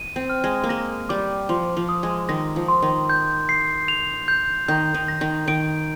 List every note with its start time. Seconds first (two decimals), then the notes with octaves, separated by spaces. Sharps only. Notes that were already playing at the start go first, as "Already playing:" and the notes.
Already playing: D#7
0.16 C4
0.30 F6
0.44 G#3
0.64 A#3
0.69 G#3 A#6
1.09 G3 D6
1.49 F3 C6
1.77 F3
1.89 D#6
2.03 G#3
2.29 D#3 A#6
2.56 F3
2.68 C6
2.82 D#3
3.10 G6
3.49 C7
3.88 F7
4.28 G6
4.68 D#3 G6
4.94 D#3
5.08 A#6
5.21 D#3
5.48 D#3 D7